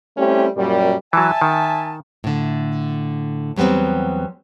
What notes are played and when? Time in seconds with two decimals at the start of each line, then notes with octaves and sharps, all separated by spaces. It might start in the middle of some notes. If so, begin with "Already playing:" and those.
0.18 G3 A3 C4 C#4 E4 G4
0.57 F#2 A#2 G3
1.13 E3 F#3 E5 G#5 A5
1.41 D#3
2.24 A2 D3
3.56 E2 F#3 G3 B3 C4